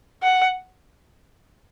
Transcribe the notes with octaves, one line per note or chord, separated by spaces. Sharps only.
F#5